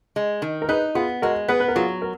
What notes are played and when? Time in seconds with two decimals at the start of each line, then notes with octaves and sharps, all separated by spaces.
0.16 G#3
0.42 D#3
0.62 A#4
0.69 D#4 G#4 B4
0.95 B3 F4 G#4
1.22 G#3 F#4 A#4
1.48 B3 G#4 B4
1.60 B4
1.68 A#4
1.76 F#3 F4 G#4
2.02 A#4